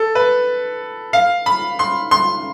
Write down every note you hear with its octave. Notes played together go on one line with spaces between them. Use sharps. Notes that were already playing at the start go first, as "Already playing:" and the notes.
Already playing: A4
B4
F5
B5
C6
C6